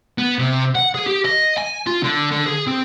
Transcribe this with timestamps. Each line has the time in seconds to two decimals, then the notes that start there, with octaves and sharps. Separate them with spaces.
0.18 B3
0.39 C3
0.75 F#5
0.95 G#4
1.07 G4
1.25 D#5
1.58 G#5
1.87 F4
2.03 D3
2.32 D3
2.47 G#4
2.67 C4